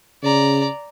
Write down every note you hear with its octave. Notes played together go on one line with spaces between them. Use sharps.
C#3 D5 A#5